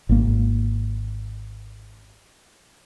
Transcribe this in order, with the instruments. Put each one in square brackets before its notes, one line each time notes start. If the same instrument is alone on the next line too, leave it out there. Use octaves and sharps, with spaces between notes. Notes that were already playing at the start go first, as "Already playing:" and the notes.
[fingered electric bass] G#1 A#3